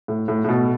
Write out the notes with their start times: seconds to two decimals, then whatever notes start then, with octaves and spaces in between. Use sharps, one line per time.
0.08 A2
0.28 A2
0.44 A2
0.48 B2